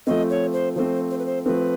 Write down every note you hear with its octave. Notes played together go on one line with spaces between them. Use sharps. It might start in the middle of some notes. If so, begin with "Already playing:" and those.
F3 A3 C4 D#5
C#5
C5
F3 A3 C4 C5
C5
B4
C5
F3 A3 C4 B4